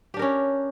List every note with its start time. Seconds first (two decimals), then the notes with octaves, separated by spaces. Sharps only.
0.14 G4
0.17 D4
0.19 A#4
0.22 C#4